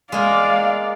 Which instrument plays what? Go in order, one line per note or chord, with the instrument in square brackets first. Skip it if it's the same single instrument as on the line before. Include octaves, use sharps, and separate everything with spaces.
[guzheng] G#3 A#3 [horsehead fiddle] D5 F5